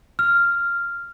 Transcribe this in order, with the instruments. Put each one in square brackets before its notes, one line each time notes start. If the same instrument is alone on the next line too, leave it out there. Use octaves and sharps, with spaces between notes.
[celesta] F6